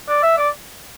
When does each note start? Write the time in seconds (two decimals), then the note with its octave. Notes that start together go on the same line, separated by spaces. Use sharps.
0.08 D5
0.23 E5
0.38 D5